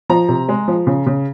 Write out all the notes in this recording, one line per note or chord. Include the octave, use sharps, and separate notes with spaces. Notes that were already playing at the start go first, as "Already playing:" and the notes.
F3 A#5
C3
G#3
F3
C#3
C#3